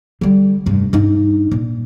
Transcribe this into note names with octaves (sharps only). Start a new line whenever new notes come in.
D3 G3
F1 G2
G2 D#4
A#2